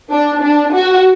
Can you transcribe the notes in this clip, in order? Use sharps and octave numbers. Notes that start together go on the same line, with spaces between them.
D4
D4
F#4